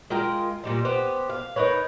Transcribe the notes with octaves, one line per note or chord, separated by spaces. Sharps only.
G#3 F4 A#4 G5
A#2 G3 D#4
B3 G4 C5
F5
D#4 A#4 B4 C#5